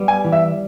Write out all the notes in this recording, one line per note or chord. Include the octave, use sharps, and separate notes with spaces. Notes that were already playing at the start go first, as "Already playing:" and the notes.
Already playing: G3 B3
G#5
E3
E5